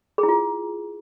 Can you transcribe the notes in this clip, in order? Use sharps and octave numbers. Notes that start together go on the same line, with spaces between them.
G#4
E4
F4